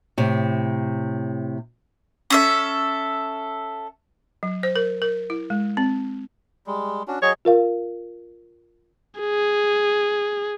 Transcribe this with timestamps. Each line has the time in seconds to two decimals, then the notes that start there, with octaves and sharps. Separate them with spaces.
0.18 A2 C3
2.30 C#4 A4 E5
4.43 F#3
4.63 C5
4.76 A#4
5.02 A#4
5.30 E4
5.50 G#3
5.77 C4
6.67 G3 G#3
7.08 C#4 D4 F#4
7.22 F#3 G#4 C#5 D#5
7.45 F4 A#4 F5
9.20 G#4